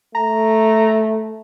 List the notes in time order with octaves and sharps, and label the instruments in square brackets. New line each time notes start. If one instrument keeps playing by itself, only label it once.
[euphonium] A3 [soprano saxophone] A#5